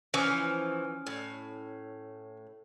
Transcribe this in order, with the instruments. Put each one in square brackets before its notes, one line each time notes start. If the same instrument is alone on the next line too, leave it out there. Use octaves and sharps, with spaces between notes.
[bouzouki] E3 F3 [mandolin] C#4
[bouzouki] A2